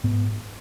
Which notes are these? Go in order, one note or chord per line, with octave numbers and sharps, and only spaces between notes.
G#2 B3